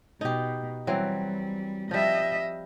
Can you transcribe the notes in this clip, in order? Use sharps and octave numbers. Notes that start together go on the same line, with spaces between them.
B2 D#4 G4
E3 F#3 G3 C4
F3 G3 D#5 E5